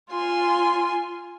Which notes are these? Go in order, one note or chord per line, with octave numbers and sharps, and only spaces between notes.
F4 G#5 C6